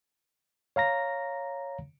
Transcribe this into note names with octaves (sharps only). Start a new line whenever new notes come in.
C#5 F5 A#5 A#6